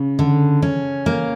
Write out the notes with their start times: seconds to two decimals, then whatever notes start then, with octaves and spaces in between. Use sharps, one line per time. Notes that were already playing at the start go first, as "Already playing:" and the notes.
Already playing: C#3
0.19 D3
0.62 C#4
1.06 A#3